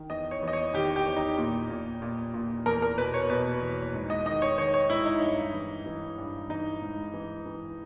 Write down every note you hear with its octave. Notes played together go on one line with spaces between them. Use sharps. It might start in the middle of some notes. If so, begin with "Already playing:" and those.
Already playing: D#3
E2 D#5
C#5
E2
D#5
C#5
D#3 G4
G4
E2
D#4
A#2
A#2
A#2
A#2
E2 A#4
A#4
B2 B4
C#5
B2 B4
E2
G#2
D#5
D#3 D#5
C#5
D#3 C#5
C#5
G#2 E4
D#4
G2
E3
E3
G2
E3 D#4
G#2
E3
E3